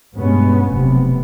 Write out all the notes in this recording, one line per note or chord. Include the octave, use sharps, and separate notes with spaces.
G2 B2 G#3 A3 B3 C#4
F1 B1 C3 B3